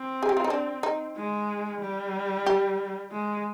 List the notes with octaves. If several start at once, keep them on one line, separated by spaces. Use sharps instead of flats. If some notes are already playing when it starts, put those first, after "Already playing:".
Already playing: C4
G#4
G4
F4
D#4
D4
D#4
G#3
G3
G4
G#3